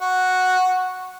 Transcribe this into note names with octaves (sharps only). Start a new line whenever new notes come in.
F#4